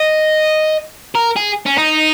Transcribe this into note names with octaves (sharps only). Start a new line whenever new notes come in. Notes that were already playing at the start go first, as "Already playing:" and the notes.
Already playing: D#5
A#4
G#4
C#4
D#4